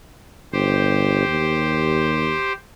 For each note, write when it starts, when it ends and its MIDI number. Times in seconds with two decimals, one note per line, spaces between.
0.53 1.25 31
0.53 2.53 67
0.53 2.53 72
1.28 2.36 39